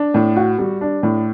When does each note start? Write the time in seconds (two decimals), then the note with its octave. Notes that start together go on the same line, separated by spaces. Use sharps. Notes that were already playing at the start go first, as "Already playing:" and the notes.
Already playing: D4
0.14 A2
0.36 F#4
0.59 G3
0.81 D4
1.03 A2